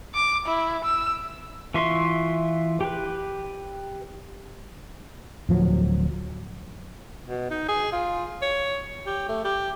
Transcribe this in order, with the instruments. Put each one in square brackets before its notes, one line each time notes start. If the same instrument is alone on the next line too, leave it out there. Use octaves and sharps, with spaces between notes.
[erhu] D6
E4
E6
[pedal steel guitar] E3 F4 E5 C6 C#6
G4 B4
[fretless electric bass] D1 F3 F#3
[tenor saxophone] B2
D#4
G#4
F4
C#5
G4
A3
G4